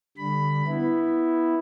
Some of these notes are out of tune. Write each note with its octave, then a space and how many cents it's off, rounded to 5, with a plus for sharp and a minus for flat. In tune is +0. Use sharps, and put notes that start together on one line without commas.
D3 +0 G3 +10 B5 +10
B3 +0 E4 +0